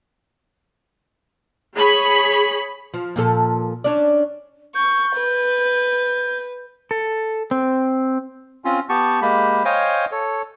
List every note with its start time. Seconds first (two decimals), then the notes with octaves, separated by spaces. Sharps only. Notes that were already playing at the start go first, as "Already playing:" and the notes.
1.76 G#4 C#5 B5
2.94 F3
3.16 A#2 F3 A4
3.84 C#4 D4 D5
4.75 C#6 G6
5.16 B4
6.91 A4
7.51 C4
8.65 C4 C#4 F4
8.89 B3 G4 A5 C#6
9.22 G#3 A#3 G4 B5
9.65 C5 C#5 D#5 F5 G5 G#5
10.12 A4 C#5